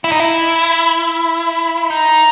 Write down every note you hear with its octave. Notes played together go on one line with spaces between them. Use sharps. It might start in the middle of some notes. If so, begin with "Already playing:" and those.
E4
D#4
E4
D#4